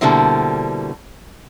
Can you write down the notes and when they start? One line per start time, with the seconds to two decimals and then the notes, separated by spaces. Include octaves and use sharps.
0.01 B2 D3 G3 A#3 E4 C5